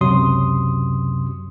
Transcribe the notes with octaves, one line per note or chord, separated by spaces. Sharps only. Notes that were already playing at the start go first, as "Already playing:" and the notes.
C#2 F#2 C3 F#3 C6 D#6